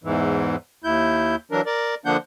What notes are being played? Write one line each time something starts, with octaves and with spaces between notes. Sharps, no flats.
E2 G#2 E3
D#2 E4 G6
E3 F#3 D4 A#4
A#4 D5
D3 F3 A#3 D4 F#5 G6